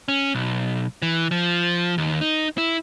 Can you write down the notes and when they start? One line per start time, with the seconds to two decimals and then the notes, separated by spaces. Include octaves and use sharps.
0.08 C#4
0.34 B1
1.02 E3
1.31 F3
1.98 D#2
2.21 D#4
2.58 E4